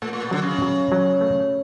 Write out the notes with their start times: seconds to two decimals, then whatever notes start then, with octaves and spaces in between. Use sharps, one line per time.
0.02 A#2 A3
0.13 A#2
0.22 B2
0.31 D3 F#3
0.42 C#3
0.62 F#3
0.92 F#3
1.21 A3